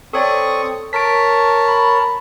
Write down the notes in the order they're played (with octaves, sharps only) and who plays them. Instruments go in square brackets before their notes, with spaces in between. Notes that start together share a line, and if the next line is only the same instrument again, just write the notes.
[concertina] C4 C#6 D#6 [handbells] A4 C#5 D5
[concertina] A#4 C#5 A5 [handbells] B6 D7
[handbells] B5